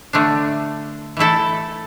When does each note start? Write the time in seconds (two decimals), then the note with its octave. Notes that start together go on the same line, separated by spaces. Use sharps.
0.13 D3 A3 D4
1.17 E3 A3 E4 A4